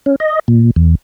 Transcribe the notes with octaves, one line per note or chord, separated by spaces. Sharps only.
C#4
D#5
A#2
E2